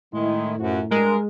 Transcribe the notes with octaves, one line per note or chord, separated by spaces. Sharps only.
A2 D#3 G#3 E4
F#2 F3 F#4
G2 G#3 A#4